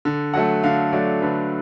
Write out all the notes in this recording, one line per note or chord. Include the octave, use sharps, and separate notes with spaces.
D3
F#3 A3 F#5
D3 F5
F#3 A3 D5
D3 B4